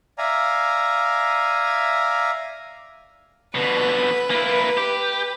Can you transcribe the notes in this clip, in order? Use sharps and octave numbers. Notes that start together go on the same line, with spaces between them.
D5 E5 F5 G#5 A#5
B2 D3 B4
A#3 E4
G4